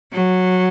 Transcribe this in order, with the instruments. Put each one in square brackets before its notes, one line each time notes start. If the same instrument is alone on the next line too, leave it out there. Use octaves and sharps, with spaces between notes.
[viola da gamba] F#3